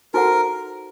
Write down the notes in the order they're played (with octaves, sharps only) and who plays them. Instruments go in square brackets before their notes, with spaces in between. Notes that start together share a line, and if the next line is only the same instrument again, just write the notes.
[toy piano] D#4 F#4 A4 C5 F#5 [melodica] A#4